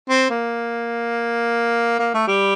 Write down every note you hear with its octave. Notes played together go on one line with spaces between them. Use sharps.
C4
A#3
A#3
A3
G3